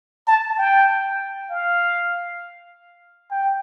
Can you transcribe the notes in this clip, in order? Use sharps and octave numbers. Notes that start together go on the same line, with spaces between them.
A5
G5
F5
G5